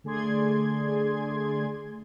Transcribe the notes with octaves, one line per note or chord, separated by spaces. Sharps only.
D3 A3 G#4 D5 C6 G#6